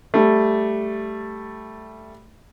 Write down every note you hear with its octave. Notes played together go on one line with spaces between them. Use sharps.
G3 A3